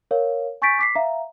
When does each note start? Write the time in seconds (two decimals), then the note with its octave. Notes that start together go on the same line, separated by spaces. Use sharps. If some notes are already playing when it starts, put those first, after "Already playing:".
0.11 A#4 C#5 F5
0.62 G#5 C#6 G6 A6 B6 D7
0.79 D6 B6 C7
0.95 E5 F5 A#5